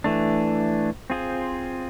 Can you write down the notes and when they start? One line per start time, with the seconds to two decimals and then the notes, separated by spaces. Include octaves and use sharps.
0.04 E3 A3 D4
1.10 C4 F4 G#4 C5